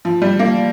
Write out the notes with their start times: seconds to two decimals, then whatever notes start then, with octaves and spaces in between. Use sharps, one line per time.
0.05 F3
0.22 G3
0.39 A#3